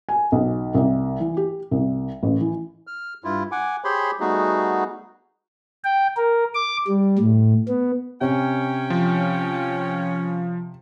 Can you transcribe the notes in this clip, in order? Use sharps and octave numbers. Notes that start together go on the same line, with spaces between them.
G#5
B1
C2
E3
G4
C2
A1
E3
F6
G2 E4 F4
F#5 G#5 D6
G4 G#4 C5 C#5 B5 C6
G3 A3 B3 D#4 F#4 G#4
G5
A#4
D6
G3
A2
B3
C3 C#4 G5
F3